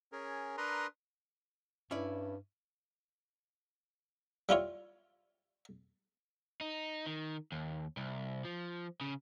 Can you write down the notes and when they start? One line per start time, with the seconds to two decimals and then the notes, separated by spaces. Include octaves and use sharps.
0.12 C#4 G#4 A#4
0.58 D4 A#4 B4 A#5 C6 D#6
1.91 G2 C#4 E4 D5
4.49 G3 E4 F4 C#5
6.61 D#4
7.07 D#3
7.52 D#2
7.97 C2
8.45 F3
9.01 C#3